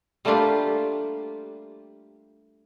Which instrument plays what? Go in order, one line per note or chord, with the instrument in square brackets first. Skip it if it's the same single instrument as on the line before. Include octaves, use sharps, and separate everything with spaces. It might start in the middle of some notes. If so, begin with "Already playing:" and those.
[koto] G3 A3 A#3 D4 F4 G4